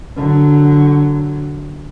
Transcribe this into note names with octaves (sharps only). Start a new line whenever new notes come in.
D3 F#3